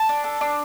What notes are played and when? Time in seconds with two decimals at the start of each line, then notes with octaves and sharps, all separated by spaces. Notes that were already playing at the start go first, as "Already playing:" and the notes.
Already playing: A5
0.09 D4
0.24 A4
0.41 D4